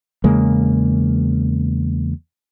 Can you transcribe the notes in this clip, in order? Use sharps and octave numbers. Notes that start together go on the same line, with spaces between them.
E2 C#3 G#3 A#3